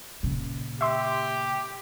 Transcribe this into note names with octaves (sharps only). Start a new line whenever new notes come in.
A#2 C#3
G4 E5 C6